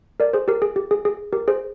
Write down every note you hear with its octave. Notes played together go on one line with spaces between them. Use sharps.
A#4 D5
G#4 C5
G4 A#4
G#4
G4
G#4
G#4
G4 A#4
G#4 C5